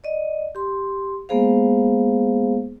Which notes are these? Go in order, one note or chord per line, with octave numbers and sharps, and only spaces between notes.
D5 D#5
G4 C6
G#3 A#3 B3 G#4 C5 F5